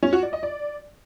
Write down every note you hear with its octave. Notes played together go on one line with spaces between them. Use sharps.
C#4
F#4
D5
D#5
D5